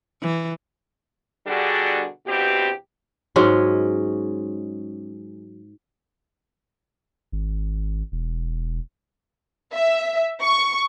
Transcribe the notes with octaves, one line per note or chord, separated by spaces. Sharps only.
E3
B2 D3 G3 D4 F#4 G#4
E2 G2 B2 C4 G4
G#2 F#3 G#3 C#4
G#1
E1
E5
C#6